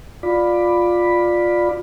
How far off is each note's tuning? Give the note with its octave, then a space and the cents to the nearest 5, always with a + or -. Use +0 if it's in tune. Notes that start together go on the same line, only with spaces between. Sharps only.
F4 +10 D5 +10 B5 +0